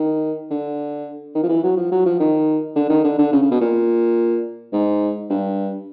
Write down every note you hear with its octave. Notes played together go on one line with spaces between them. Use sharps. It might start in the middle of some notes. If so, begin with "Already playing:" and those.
Already playing: D#3
D3
D#3
F3
E3
F#3
F3
F#3
F3
D#3
D3
D#3
D3
D3
C#3
C#3
B2
A#2
G#2
G2